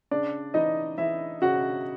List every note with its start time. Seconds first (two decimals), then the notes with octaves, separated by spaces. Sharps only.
0.11 C#3 D4 D5
0.54 E3 D#4 D#5
0.98 E3 E4 E5
1.42 C#3 F#4 F#5